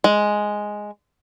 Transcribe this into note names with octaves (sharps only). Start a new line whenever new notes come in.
G#3